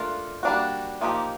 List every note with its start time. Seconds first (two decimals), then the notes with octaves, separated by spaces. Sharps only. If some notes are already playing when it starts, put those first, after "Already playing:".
Already playing: A3 D4 F4 A#4
0.43 G3 A#3 D4 F#4
1.01 F3 A#3 D#4 G4